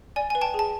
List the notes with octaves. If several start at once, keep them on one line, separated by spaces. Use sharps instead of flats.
D5 G#5
B4 G#5
G5 A5
G#4
A5